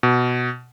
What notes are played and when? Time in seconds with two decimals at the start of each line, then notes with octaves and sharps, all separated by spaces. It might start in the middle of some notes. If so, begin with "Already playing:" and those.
0.03 B2